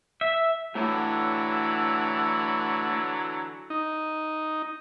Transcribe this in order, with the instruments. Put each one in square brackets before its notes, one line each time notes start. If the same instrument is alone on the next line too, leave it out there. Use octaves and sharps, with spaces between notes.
[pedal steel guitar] E5
[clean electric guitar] A2 [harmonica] D3 E3 F#3
[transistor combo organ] D#4